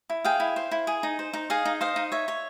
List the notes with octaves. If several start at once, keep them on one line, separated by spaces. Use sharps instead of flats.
E4
G#4 F5 G5
E4
C5
E4
G#4
D#4
C5
D#4
G#4 D#5 F5
D#4
C5 D#5 F5
D#4
C#5 E5
C#5